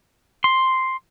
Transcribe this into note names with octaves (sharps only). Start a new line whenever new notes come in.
C6